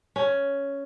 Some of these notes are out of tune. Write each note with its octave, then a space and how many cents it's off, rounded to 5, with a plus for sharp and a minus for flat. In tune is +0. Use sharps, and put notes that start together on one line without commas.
C#4 +5